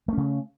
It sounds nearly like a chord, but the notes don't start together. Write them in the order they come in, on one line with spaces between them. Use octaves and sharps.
A3 C#4 C#3